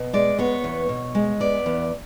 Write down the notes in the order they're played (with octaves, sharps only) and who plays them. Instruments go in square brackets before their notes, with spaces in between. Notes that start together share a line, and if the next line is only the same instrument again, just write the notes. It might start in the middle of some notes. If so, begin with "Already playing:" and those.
Already playing: [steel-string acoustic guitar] B2
G#3 D5
B3 C#5
E2
B2
G#3
B3 D5
E2